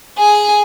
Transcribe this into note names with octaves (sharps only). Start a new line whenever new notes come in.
G#4